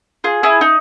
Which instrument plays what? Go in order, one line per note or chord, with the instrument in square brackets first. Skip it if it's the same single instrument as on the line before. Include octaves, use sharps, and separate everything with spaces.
[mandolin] F4 G#4
E4 G#4
D#4